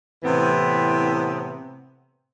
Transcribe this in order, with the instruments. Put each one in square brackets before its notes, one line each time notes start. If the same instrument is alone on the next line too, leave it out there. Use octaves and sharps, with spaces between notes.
[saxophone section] A2 C3 E3 B3 C4